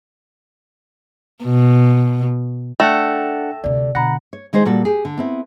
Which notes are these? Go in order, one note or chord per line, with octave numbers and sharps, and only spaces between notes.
B2
A3 D4 A4 F#5 G5 A#6 E7
D2 C3 D5
B2 D3 F#5 A#5 B5 A#6
C#5
D#3 G#3 D#4 C5
A#2 G3 F#4 A4
G4 G#4
D3
B3 C4 E4